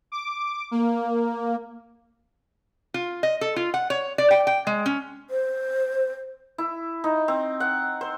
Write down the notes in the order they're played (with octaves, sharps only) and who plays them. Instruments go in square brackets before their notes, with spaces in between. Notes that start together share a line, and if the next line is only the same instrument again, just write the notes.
[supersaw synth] D6
A#3
[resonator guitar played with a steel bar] F4
D#5
A4
F4
F#5
C#5
D5
G5
G5
G#3
C#4
[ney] C5
[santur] E4
D#4
C4
F#5
C5